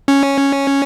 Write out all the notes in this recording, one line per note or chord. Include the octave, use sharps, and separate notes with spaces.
C#4